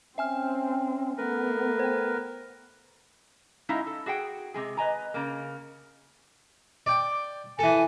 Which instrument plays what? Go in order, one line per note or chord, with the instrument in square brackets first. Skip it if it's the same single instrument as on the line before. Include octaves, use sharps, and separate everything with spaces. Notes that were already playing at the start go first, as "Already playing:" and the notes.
[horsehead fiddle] C4 [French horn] C#4 [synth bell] E5 G#5 F6
[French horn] A3 [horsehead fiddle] B3 [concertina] A#4 B4
[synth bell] C5 G5
[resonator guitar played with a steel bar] G#3 C#4 D#4 E4 E5 F5
A4
F#4 G#4 F#5 G5
C3 G#3 G#4
B4 D#5 G#5 A#5
C#3 A#3
[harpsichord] D5 G5
[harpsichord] E3 A4 [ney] G#5